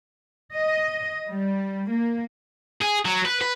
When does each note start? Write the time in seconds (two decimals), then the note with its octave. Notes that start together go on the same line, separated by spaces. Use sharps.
0.55 D#5
1.28 G3
1.91 A#3
2.82 G#4
3.06 F#3
3.25 B4
3.41 B4